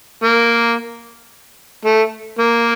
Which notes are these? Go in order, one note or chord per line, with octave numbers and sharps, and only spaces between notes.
A#3
A3
A#3